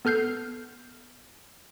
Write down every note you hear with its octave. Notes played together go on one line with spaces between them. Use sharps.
B3 A4 F6 G6 C7